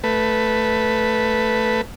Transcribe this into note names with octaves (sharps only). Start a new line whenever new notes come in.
A3 B4